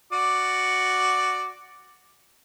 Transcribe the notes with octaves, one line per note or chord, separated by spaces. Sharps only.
F#4 D5